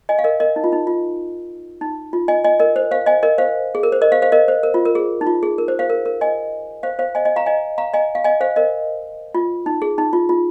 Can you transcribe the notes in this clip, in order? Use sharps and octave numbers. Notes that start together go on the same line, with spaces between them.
D#5 G#5
F5
A#4 D#5
A#4 D#5
D#4
F4
D#4
F4
D#4
F4
D#5 G#5
D#5 G#5
A#4 D#5
C5
C5 F5
D#5 G#5
A#4 D#5
C5 F5
G#4
A#4
C5
A#4 D#5
C5 F5
C5 F5
A#4 D#5
C5
A#4
F4
A#4
G#4
D#4
F4
G#4
A#4
C5
C5 F5
A#4
A#4
D#5 G#5
C5 F5
C5 F5
D#5 G#5
D#5 G#5
F5 A#5
D#5 G#5
F5 A#5
D#5 G#5
F5
D#5 G#5
C5 F5
A#4 D#5
F4
D#4
G#4
D#4
F4
F4